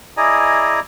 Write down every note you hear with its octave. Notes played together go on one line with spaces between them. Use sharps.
E4 G#4 D5 D#5 G#5 A#5